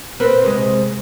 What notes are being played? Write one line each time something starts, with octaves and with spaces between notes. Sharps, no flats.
C4 A#4 B4
C3 G#3